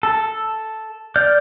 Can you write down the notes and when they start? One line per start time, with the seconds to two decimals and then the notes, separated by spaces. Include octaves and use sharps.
0.03 A4
1.16 D5 F6 G6